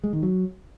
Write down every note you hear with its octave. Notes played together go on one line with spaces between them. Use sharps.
G#3
D#3
F#3